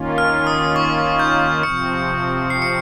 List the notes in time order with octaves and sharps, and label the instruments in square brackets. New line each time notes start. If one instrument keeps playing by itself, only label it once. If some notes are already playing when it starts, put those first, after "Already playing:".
Already playing: [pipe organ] D#3 A#3 C#4 F4
[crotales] F6
D#6
C#6
G6
[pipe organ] C3 F3 C4 [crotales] C#7
[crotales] C7
C#7